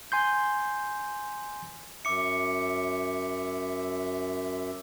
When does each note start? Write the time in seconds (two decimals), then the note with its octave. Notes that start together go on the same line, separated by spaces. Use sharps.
0.12 G#5 C6 G6
2.05 F#2 E5 D6 C#7